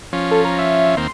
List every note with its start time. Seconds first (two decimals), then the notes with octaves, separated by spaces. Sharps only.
0.13 F3 C#4
0.31 A4
0.45 A#5
0.58 E5
0.97 D#2 A#3 C4 C6